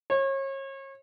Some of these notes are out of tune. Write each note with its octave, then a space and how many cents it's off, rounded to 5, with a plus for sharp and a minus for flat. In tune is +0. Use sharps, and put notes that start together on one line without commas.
C#5 -35